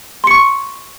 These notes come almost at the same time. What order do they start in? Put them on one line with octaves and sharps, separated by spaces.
C6 C#7 C#6